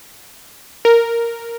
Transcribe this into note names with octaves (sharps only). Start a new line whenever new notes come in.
A#4